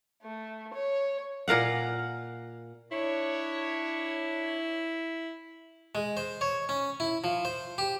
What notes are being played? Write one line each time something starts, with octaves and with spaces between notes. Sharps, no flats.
A3
C#5
A#2 A#4 F5 F#5
D4 E4 C#5
G#3
C5
C#5
C#4
E4
F3
C5
G4